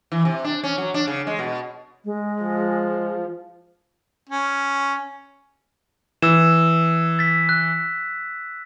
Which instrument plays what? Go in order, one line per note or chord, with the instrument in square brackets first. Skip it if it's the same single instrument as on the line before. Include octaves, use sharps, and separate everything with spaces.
[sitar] E3
C3
D4
C#4
F#3
D4
C#3
G#3
B2
[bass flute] G#3
[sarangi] F3
[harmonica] C#4
[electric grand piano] E3 [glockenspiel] E6 E7
[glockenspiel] A6 B6
F#6